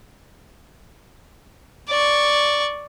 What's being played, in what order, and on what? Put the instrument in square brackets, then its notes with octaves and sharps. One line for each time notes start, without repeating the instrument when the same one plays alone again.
[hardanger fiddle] D5 C#6